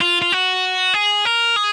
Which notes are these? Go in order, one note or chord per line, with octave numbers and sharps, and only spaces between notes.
F4
F4
F#4
G#4
A#4
G#4